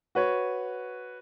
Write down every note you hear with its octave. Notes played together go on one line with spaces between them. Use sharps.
F#4 B4 C#5